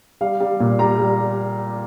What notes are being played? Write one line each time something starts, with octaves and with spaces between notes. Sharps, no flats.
G3 F5
G3
A#2
G3 A#5
G3